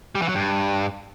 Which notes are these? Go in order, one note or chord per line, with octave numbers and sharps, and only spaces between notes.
G3
E3
F#3
G2